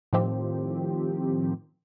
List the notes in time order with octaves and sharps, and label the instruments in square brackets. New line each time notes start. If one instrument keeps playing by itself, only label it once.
[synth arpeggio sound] A2 D#3 F3 C4 G4